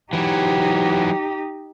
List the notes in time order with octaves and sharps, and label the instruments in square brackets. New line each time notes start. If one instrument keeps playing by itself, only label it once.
[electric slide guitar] E3 F#3 [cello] D#4 G4